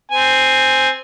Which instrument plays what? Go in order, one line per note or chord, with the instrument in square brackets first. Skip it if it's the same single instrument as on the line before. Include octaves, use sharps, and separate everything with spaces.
[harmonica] C4 G#5